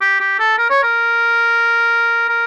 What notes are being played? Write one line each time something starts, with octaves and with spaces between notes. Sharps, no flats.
G4
G4
A4
A#4
C#5
A#4
A#4